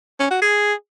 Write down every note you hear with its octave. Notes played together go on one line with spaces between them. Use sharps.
C#4
F#4
G#4